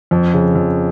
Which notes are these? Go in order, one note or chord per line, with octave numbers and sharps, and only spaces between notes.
F2
C#3
F2